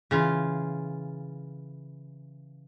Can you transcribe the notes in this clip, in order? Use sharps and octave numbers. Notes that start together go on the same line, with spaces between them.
C#3 E3 F4